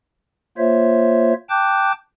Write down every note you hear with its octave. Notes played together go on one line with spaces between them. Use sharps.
A#3 F4 C5 C#5 E5
G5 A5 D6 F#6 G6